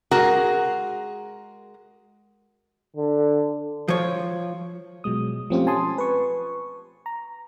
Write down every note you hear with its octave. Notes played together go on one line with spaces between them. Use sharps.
G#3 F#4 G#4 A#4
D3
F3 C#5
B2 F#3 G#3 D#6
F3 A3 C4 C#4 F4 G4
G#5 A5 C6 D#6
B4 C#6
A#5